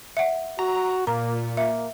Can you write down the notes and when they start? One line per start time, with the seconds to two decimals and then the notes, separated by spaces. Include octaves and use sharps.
0.17 E5 F#5
0.59 F#4 A#5
1.07 A#2 A#3 A#5
1.57 A#3 E5